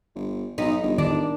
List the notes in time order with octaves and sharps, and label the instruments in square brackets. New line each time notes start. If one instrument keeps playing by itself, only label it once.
[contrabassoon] G1
[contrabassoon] B1 [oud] D#4
[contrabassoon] G1
[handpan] D#3 [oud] D4